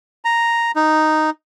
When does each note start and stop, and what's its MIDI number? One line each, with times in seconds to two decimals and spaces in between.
0.25 0.71 82
0.76 1.30 63